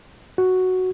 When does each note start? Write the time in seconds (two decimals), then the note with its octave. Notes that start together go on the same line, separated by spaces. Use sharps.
0.38 F#4